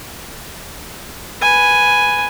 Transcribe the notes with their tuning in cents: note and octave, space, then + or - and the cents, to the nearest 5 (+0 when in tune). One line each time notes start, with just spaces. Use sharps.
B4 +0 G#5 +0